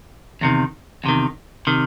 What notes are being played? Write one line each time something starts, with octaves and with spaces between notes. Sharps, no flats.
E2 C3 D#3
E2 C3 D#3
C3 D#3